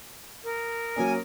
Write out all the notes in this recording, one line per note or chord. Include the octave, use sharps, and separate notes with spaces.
A#4 D#6
F#3 A#3 C#4 G#5